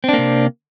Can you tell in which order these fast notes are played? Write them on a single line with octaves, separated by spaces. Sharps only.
C4 D4 A#3 C3